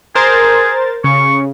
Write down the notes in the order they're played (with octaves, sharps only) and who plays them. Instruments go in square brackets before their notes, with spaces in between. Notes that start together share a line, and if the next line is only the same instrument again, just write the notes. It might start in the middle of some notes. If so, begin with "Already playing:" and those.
[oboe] G#4 [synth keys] A#4 C5 A6
[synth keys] C#3 [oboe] C#6